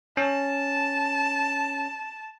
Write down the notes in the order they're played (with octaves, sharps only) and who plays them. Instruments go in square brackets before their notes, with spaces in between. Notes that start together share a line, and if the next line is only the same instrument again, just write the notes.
[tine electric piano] C#4 [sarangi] A5